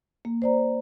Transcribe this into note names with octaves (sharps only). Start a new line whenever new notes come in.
A#3
C5 D5 A#5